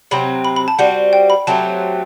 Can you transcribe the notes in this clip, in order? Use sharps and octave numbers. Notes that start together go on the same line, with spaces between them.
C3 F#3 C4 B5
B5
B5
A5
G3 C4 F#4 F#5
G5
B5
F#3 A3 C4 G4 A5